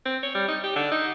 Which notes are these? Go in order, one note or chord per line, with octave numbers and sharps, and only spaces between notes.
C4
C#5
G3
D#4
G4
D3
D#4